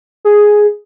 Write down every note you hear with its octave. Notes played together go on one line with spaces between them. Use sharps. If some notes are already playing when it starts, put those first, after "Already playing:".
G#4